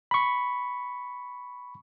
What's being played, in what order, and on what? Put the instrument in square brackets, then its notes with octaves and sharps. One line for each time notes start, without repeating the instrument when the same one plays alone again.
[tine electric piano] B5 C#6